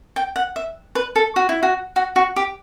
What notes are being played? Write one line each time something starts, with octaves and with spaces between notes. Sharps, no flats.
G5
F#5
E5
B4
A4
F#4
E4
F#4
F#4
F#4
G4